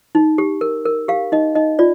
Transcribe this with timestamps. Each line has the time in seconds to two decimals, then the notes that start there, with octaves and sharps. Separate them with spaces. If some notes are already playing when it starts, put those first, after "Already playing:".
0.15 D#4
0.38 G4
0.61 A#4
0.85 A#4
1.08 G4 F5
1.32 D#4 D#5
1.55 D#4 D#5
1.79 F4 D5